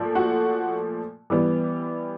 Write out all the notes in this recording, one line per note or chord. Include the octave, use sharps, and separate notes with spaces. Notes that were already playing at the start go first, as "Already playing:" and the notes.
Already playing: A#2 F3 A3
F#4 F#5
E3 G3 B3